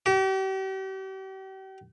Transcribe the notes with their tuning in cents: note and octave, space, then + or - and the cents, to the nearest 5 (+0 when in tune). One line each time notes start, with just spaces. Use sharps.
G4 -40